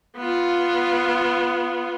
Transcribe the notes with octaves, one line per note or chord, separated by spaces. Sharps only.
B3 F4